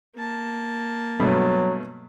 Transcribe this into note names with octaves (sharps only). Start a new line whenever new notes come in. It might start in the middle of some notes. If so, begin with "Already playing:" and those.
A#3 A5
G2 B2 F#3 A3